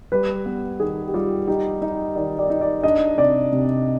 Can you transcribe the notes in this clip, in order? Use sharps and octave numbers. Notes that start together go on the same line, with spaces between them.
G3 B4
B3
D#3 G#4
G4
G3 F4
D#4 G4
D#4 D#5
D#3 D5
D5
D#4
D5
D4 D#5
C3 D5
C3